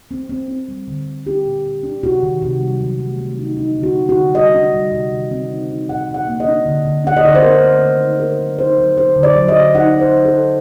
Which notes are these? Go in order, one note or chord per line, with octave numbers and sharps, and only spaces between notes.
C4
C4
C4
G3
D3
D3
D4 G4
A#2
A#2
D4
C3 F#4
D#3
C3
G3
F#3
A3
A3
D#4
A3 D#4
D3
F#4
A3
F#4
D3
G3 D#5
D4
G3
C3
D#3
C4
D#4
D#4
A#2 F#5
A#2
F#5
A#3
D#5
D4
D3
D3
D4 F#5
D#5
D3 D5
C5
C4 A#4
A3
D#3
D#4
C4 A#4
F#3
D#4 C5
F#3
F#3 C5
D3
D5
F#3
D#5
D3
D#4 F#5
F#3
C5
F#3
A4
D#4